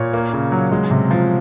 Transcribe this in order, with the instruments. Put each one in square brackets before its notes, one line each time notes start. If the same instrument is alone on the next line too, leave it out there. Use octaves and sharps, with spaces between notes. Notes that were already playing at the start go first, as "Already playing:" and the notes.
Already playing: [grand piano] A#2 C#5
A#3
C#3
F#3
G#3
C3
F3